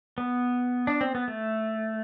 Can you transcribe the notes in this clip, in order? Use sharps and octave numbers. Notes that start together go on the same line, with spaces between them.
B3
D4
C4
B3
A3